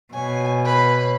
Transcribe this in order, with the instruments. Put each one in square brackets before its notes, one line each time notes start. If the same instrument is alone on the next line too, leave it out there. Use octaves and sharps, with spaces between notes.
[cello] B2 [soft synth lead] C#5 [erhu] G#5
[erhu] B4